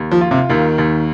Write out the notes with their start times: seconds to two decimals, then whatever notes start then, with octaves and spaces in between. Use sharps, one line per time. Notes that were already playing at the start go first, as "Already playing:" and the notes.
Already playing: D#2
0.11 F3
0.21 F4
0.31 C3
0.49 D#2 D#3
0.78 D#2